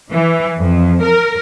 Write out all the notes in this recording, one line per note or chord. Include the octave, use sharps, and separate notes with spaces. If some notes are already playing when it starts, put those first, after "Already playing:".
E3
F2
A#4